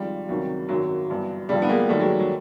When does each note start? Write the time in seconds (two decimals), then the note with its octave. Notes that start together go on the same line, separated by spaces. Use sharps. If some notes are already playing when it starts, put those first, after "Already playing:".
Already playing: G#1 G#2 F3 G3
0.29 C#2 C3 D#3 F#3
0.69 G#1 F#2 D#3 F#3
1.10 G1 G2 E3
1.49 A1 G2 D3 F3 G3
1.62 B3
1.69 G#3 A#3
1.89 D#2 D#3 F#3 G3 A3
2.00 F#3 G#3
2.20 F#3